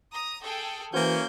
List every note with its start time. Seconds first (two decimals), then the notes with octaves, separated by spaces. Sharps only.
0.12 A#5 D#6
0.43 G#4 A4 G5
0.94 E3 A#3 C#4 F#4 C5 G6